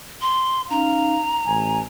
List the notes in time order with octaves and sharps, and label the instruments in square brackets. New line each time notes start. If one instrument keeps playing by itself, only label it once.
[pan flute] C6
[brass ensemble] C#4 D#4 F5 [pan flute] A#5
[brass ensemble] A1 G#5